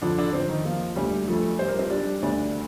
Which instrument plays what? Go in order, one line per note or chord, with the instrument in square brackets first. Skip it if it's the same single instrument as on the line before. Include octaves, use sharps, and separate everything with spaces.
[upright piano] F2 [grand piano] D3 D4
[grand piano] D3 D4
[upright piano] F2 [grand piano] C4
[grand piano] D#3 D#4
[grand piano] F3 F4 [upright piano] A#3
[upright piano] D2 [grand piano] G3 G4
[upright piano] F2 [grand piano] A3 A4
[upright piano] G3 [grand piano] C5
[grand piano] A#4
C4 C5
[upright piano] G3 [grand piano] D4 D5
[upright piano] D2 [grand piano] D4 D5